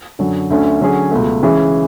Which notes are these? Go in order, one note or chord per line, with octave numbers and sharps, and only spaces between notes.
F#2 D3 F#3
D2 D3 A3 C#4
D3 F#3 C#4 G#4
C#2 B2 A3
C#3 E3 G#3 C#4 G#4